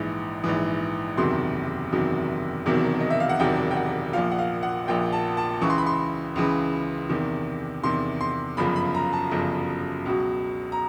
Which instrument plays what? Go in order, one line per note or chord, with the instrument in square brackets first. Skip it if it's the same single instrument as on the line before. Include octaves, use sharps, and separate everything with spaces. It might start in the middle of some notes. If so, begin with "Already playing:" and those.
Already playing: [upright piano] A#1 G#2 E3
A#1 G#2 E3
F#1 E2 C3 D#3 F#3 C6
F#1 E2 C3 D#3 F#3
E1 E2 C3 D#3 F#3
D#5
E5
F5
F#5
E1 E2 C3 D#3 F#3 G5
G5
F#5
A#1 A#2 F3 F5
F#5
F5
F#5
A#1 A#2 F3 G5
A5
A5
C#2 C#3 E3 C#6
C6
B5
C6
C#2 C#3 E3
E2 C3 D#3
E2 C3 D#3 C6
C6
G1 F#2 C#3 F3 B5
B5
A#5
A5
G1 F#2 C#3 F3
C#2 B2 F#3
A#5